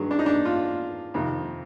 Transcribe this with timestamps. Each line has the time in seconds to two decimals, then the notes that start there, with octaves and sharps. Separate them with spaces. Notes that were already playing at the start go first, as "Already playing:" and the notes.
Already playing: G2 D#3 F#3 G#4
0.11 D4
0.19 D#4
0.26 D4
0.45 F4
1.14 F2 C3 D#3